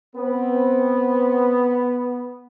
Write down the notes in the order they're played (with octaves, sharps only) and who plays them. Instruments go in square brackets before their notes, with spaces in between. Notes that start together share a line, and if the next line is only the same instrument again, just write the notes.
[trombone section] B3 [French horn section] C4 B4